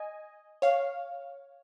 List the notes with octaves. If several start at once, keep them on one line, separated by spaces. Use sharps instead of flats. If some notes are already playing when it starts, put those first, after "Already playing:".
Already playing: D#5 G#5
C#5 F5